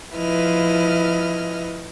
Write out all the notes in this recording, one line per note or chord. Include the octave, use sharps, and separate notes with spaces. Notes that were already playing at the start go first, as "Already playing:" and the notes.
F3 E4 B4 D#5 F6